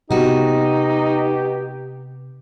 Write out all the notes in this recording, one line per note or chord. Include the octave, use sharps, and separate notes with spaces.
C3 B3 D#4 F#4 G4